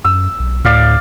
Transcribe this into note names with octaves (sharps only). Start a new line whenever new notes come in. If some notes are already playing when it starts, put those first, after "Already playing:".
F#2 E6
B1
D2 A2 D5 F5